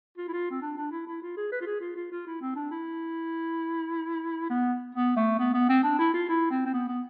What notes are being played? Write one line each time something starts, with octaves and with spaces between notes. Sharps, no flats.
F4
E4
F4
C4
D4
D4
E4
E4
F4
G#4
B4
F4
G#4
F4
F4
F4
E4
C4
D4
E4
B3
B3
A3
B3
B3
C4
D4
E4
F4
E4
C4
C4
B3
B3